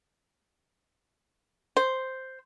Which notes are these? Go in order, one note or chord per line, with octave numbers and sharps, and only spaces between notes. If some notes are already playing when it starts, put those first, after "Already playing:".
C5